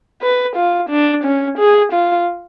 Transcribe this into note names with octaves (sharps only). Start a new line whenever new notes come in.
B4
F4
D4
C#4
G#4
F4